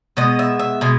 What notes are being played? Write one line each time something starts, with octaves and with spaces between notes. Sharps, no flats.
B2 G#3 B3 D#5
E5
E5
B2 G#3 G#5